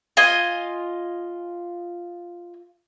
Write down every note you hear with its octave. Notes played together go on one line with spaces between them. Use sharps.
F4 D#5 G#5